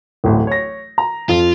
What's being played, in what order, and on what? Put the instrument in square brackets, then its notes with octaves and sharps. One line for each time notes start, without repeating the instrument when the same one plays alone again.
[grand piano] D1 A1
C#5 A#6
A#5
[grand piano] F2 [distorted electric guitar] F4